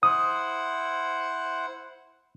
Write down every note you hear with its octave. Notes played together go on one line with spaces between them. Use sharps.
E4 C5 F#5 D#6